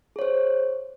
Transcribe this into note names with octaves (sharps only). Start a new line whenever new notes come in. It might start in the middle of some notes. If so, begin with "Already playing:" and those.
G#4 C5 C#5